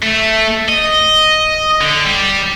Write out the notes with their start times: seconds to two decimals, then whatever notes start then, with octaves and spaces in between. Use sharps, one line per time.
0.02 A3
0.68 D#5
1.81 D3
2.05 G3